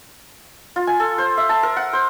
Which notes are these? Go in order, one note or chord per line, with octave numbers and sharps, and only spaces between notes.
F4
G#5
A4
C5
E5
A5
A#4
F#5
C5